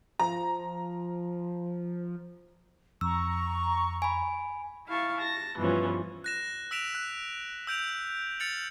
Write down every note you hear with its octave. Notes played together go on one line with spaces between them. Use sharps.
F3 A#5
F2 A#5 C#6 E6
G#5 B5
E4 F5 A5 C#6
A5 A#6
G2 B2 E3 F3 C#4
F#6 A#6 E7
E6 A#6 B6 D7 E7 F7
F#6
E6 G6 D7 F7
F6 A6 C#7 F7 F#7